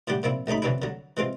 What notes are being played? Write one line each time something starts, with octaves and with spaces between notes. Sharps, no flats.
A2 D3 G3 F#4 G4
A#2 F3 C4 E4
A1 A3 C#4 D#4 B5
F2 D3 E3 C#4 D4 E4
D3 F#3
E3 G#3 C4 F4